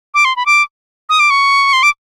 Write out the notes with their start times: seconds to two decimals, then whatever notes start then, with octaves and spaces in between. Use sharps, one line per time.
0.14 D6
0.25 C6
0.36 B5
0.46 D6
1.09 D#6
1.20 D6
1.30 C#6
1.73 C6
1.83 D6